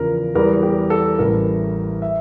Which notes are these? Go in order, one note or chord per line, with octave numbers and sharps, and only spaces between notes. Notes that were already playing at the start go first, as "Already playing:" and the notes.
Already playing: E2 C#3 F3 A#4
E2 E3 G3 A#4
G4
A4
A1 A2 E3 G3 A#4
E5